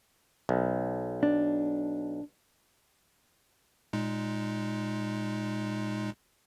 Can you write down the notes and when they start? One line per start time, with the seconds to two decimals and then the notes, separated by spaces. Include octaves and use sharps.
0.49 B1
1.23 D4
3.93 A#2 G#3 D#4